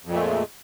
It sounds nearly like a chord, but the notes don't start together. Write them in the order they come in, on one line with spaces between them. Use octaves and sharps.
F2 A#2 A3 G#3